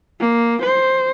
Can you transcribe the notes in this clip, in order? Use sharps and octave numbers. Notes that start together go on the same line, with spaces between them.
A#3
C5